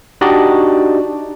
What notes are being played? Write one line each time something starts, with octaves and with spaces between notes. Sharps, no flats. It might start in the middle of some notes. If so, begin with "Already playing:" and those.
D4 D#4 F#4 G4 D5 D#5